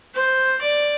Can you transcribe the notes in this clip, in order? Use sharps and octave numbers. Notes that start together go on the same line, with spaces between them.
C5
D5